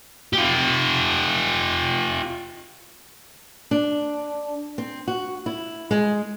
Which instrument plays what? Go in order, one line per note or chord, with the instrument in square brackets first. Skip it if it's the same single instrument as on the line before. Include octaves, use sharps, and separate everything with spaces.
[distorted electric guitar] F4 G4
[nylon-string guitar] D4
C4
F#4
E4
G#3